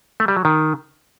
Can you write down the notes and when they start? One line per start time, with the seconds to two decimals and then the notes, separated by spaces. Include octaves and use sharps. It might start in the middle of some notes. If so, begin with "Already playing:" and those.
0.20 A3
0.28 G3
0.37 F#3
0.45 D#3